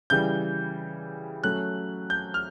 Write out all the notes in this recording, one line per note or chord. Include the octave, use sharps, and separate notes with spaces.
C#3 E3 G3 G6
F#3 A3 C#4 F#6
G6
F6